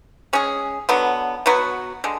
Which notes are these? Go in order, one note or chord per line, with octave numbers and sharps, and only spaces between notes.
G#3 C#4 G#4
D3 F#3 B3
B2 F#3 B3 F#4
D3 G#3